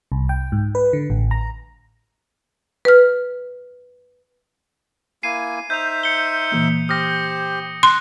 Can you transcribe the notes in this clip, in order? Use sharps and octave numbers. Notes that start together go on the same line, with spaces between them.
C2
G5
G#2
B4
D3
A1
A#5
B4 F6
A#3 E4 G#5 C7 D#7
D#4 C5 E5 G6 F7
C#7 G7
A#2 E3 A#3
G4 C5 D#6 F6 A#6
C6 F#6